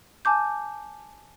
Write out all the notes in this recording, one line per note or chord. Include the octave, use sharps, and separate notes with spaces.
G#5 A5 D6 G6